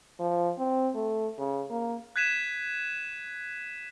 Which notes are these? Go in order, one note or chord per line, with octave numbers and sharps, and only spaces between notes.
F3
C4
A3
C#3
A#3
F#6 G#6 B6 D#7 E7